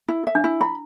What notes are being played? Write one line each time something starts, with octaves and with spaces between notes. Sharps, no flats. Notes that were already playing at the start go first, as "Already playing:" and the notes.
E4
E5
D4
E4
E4 B5